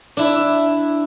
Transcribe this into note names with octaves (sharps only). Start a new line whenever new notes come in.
D4 E4